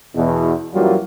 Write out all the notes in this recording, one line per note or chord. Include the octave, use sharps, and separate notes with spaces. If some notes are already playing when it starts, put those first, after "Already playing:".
E2 B2
F#2 E3 F#3 G3 A#3 F4